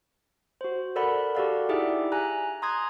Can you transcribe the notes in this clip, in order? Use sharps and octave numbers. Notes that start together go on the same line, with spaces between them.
F#4 C5
A4 A#4 D5 F#5 B5
F#4 G4 A4 D5 F5 F#5
D#4 E4 G4 G#4 D5 E5
G#5 A#5 F#6
A#5 C6 D#6 F#6 G#6